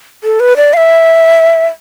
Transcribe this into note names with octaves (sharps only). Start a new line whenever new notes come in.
A4
B4
D5
F5
E5